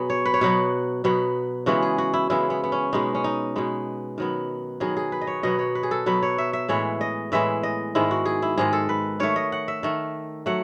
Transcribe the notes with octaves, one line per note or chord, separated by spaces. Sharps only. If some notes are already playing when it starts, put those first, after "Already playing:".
Already playing: B2 F#3 B3 G#4
C#5
B4
C#5
B2 F#3 B3 B4
B2 F#3 B3
C#3 E3 G#3 B3 F#4
G#4
F#4
E4
C#3 E3 G#3 B3 E4
B3
B3
C#4
B2 G#3 B3 D#4
C#4
D#4
B2 G#3 B3
D#3 F#3 B3
D#3 F#3 B3 G#4
G#4
B4
D#5
C#5
B2 F#3 B3 D#5
C#5
B4
G#4
A4
B2 F#3 B3 B4
C#5
E5
E5
A2 E3 G#3 B3 C#5
D#5
A2 E3 G#3 B3 E5
D#5
G#2 D#3 G#3 E4
F#4
G#4
E4
G#2 D#3 G#3 G#4
A4
B4
D#3 A3 C#5
D#5
F#5
E5
D#3 A3
F#3 A3 F#5